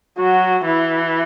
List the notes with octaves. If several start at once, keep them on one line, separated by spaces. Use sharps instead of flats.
F#3 F#4
E3 E4